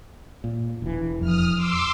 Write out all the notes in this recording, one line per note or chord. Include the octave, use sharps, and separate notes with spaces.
A#2
E1 E3
F2 D#6 F6
C6 D6 E6